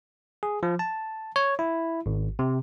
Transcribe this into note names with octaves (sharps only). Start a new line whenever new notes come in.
G#4
F3
A5
C#5
E4
G#1
C3